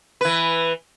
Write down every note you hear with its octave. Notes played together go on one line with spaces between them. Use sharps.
E3 B4